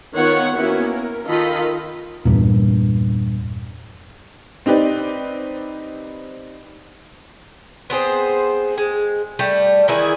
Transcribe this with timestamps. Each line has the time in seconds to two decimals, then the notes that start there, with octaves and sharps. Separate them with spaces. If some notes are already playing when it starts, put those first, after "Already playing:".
0.14 D#3 B3 F4 C#5 F#5
0.56 A#3 B3 C#4 E4 F#4
0.85 A#4
1.26 D#3 F4 A4 D#5 B5
2.25 E2 G2 A#2
4.66 C4 D#4 G4 B4 D5
7.90 B3 C4 G#4 C5
8.78 G#3
9.39 G3 A3
9.88 D#3 E3 E4 G#4